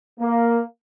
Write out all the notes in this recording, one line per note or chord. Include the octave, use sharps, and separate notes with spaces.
A#3